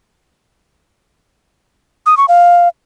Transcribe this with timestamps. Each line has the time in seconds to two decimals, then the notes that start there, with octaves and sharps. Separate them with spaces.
2.06 D#6
2.17 C#6
2.28 F5